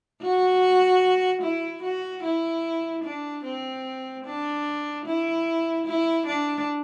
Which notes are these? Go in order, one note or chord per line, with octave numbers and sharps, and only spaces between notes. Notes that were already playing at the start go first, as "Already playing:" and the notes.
F#4
E4
F#4
E4
D4
C4
D4
E4
E4
D4